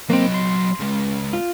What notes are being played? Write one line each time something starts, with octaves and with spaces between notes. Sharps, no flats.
F#3 A#3 C4 D#5
C6
C#3 G#3
F4